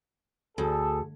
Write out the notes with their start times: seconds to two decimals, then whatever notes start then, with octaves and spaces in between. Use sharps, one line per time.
0.58 D2 G#4 A4